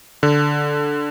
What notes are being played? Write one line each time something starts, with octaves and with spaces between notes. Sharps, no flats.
D3